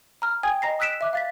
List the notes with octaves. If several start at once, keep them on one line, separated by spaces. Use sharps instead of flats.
A#5 F6
G5 G#5 D#6 G#6
D#5 A#5 A#6 C7
D#6 E6 F#6 B6 D7 E7
E5 D6 F#6
F5 A6 B6